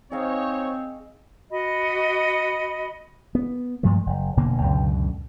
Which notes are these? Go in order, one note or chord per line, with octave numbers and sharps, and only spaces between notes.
C4 D#4 G#4 C5 C#5 D#5 F5
F#4 D#5 B5
B3
G2 F3 G#3 A3
F#1
F1 B2 D3 A#3
C#2 F#2 B2 D3